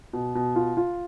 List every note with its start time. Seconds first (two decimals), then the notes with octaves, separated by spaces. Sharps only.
0.13 B2
0.35 B2
0.56 F4
0.77 F4